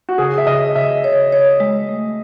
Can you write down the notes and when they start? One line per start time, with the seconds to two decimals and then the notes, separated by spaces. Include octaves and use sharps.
0.09 F#4
0.18 C#3 G#4
0.38 E5
0.47 C#3 D#5
0.75 C#3 E5
1.04 C#5
1.32 C#5
1.60 G#3
1.89 A3